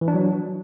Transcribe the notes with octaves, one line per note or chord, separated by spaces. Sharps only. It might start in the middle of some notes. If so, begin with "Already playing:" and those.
E3
D4
F#3